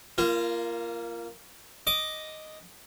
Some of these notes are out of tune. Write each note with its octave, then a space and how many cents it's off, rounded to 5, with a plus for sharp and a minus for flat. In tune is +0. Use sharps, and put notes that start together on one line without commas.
A#3 +0 F4 -30
D#5 +0 D6 +0